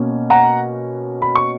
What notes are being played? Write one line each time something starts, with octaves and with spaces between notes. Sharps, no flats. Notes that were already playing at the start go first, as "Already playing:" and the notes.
Already playing: B2 A#3 C#4
F#5 A#5
B5
C#6